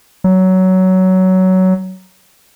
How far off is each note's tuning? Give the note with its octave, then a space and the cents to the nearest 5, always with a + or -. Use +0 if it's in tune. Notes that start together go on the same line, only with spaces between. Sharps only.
F#3 +15